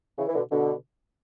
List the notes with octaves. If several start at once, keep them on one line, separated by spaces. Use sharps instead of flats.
C#3 E3
E3
B2 D3
B2 D3